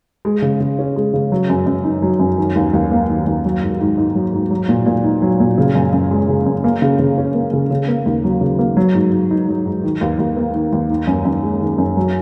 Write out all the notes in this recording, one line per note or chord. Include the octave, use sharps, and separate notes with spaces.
G#3
C#3
C#3
C#4
G#3
C#3
F#3
F#2
F#2
D#4
F#3
F#2
D#3
D#2
D#2
A#3
D#3
D#2
F#3
G#2
G#2
D#4
F#3
G#2
F#3
A#2
A#2
D#4
F#3
A#2
C#3
F#2
F#2
G#3
C#3
F#2
A#3
C#3
C#3
C#4
A#3
C#3
C#3
A#3
D#2
F#3
C#3
A#3
F#3
G#2
G#2
D#4
F#3
G#2
D#3
D#2
D#2
A#3
D#3
D#2
D#3
F#2
F#2
G#3
D#3
F#2
F#3